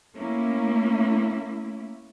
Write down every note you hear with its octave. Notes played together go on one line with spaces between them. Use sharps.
A3 A#3 C#4 E4